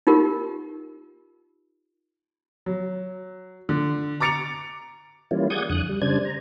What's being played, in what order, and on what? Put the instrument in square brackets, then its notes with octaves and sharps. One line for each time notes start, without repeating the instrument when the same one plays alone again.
[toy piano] D#4 F4 G4 A#4
[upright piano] F#3
D3
A#5 D6 A6 C#7 D7 F7
[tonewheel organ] E3 G3 A#3 C#4 E4 F4
G#4 D5 F#5 D#6 G6 G#6
F2 D3 D#6 F#6
G3
C#3 G3 D4 C5 D5 G#6
A#5